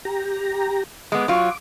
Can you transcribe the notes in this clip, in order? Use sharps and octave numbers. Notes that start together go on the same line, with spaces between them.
G4 A#5
G#3 B3 D6
F#3 F4